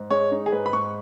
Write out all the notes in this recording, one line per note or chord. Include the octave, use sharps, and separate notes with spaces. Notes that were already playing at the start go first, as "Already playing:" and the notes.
Already playing: G#2
G#3 C#5
D#4
G#4
G#2 B4
B5
G#2 C#6